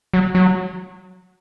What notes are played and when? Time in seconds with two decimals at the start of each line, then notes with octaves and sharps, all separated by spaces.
0.14 F#3
0.35 F#3